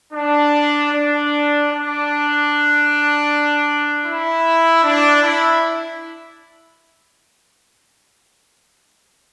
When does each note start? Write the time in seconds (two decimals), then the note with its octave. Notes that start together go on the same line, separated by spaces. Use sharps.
0.13 D4
0.92 D4
1.70 D4
4.05 E4
4.84 D4
5.23 E4